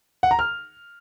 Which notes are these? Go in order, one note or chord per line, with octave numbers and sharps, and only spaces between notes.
F#5
A#5
F6